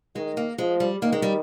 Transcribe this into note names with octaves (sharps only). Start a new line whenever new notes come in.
D#3 G#3
A#3
F3 G#3
G3
D#3 A#3
G#3
G3